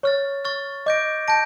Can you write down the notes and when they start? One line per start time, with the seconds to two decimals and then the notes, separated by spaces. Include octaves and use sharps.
0.03 C#5 C#6 F6 A6
0.45 C#6 F6 A6
0.86 D#5 D6 G6 A#6 D7
1.28 A5 G6 A#6 D7